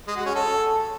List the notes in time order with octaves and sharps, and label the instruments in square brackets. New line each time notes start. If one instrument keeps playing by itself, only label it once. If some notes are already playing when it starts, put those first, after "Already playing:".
[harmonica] G#3
F#4
C#4
A4